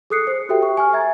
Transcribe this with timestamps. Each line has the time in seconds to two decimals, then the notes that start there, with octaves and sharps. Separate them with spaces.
0.10 G#4 A4 D#6 F#6 C7 C#7
0.27 C5
0.49 F#4 G4 A4 E5 G5
0.62 C#6
0.77 G#5 C#6 F6
0.93 E5 A#5 G#6 A6